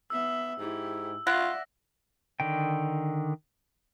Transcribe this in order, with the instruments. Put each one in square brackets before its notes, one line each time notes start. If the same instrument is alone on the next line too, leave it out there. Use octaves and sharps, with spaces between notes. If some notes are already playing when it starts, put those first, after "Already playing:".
[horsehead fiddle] B3 E5 [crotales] E6
[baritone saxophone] G#2 [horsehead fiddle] E4 G4
[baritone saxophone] F4 [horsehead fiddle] D5 E5 [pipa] F#5 [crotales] A#6
[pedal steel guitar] D3 D#3 G5